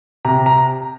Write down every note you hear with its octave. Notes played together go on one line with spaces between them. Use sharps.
C3 A#5
A#5